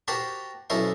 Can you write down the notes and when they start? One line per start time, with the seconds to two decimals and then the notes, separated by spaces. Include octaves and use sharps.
0.08 F#4 G4 A#4 C5 A5 B5
0.70 B1 C#4 E4 A4 A#4 C5